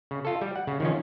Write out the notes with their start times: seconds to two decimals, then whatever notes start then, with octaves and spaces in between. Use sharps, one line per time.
0.11 C#3
0.25 F4 A4
0.41 G3
0.56 F#5
0.67 C#3
0.80 D#3 F3 C#4